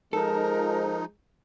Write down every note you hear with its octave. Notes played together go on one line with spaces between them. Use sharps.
F3 G#3 D#4 A4 A#4